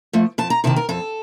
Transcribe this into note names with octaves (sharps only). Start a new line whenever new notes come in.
F3 A3
F2 A5
A#5
C3 D#3 A5
A#4
F2 A4